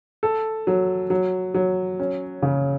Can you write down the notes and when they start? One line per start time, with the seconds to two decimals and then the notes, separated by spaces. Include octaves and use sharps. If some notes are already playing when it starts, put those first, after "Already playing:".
0.23 A4
0.67 F#3
1.10 F#3
1.54 F#3
2.00 C#4
2.42 C#3